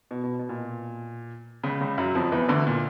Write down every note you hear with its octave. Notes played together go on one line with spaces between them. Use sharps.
B2
B2
B2
A#2
C#2 C#3
C#2 C#3
F#2 F#3
F2 F3
E2 E3
D2 D3
A#2